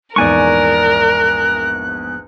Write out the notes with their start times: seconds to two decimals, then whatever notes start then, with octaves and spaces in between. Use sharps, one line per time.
0.16 A#1 E2 G#2 A#4 D5 G#5 C#6 F#6